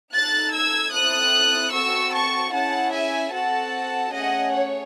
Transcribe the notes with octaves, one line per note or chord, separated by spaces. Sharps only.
D#4 A4 F#6 A6
E6 G#6
C4 E4 A4 D#6 F#6
C4 F#4 A4 C#6 E6
A5 C#6
C#4 E4 G#4 F#5 A5
E5 G#5
C4 F#4 A4 F#5 A5
A3 C#4 G#4 D#5 F#5
C#5